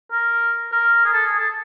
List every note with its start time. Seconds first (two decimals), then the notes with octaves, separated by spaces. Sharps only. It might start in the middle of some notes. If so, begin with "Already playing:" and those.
0.11 A#4
0.72 A#4
1.05 G#4
1.13 A4
1.26 G#4
1.39 A4